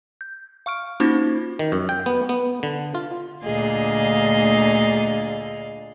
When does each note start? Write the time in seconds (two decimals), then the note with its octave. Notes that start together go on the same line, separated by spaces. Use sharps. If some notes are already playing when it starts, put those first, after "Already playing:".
0.21 G6
0.66 F5 C#6 F6 D7
1.00 A#3 C#4 D#4 F4 F#4 C5
1.59 D#3
1.72 F#2
1.89 G5
2.06 B3
2.29 B3
2.63 D3
2.95 F4
3.43 D2 A#2 D3 G#4 D#5 F5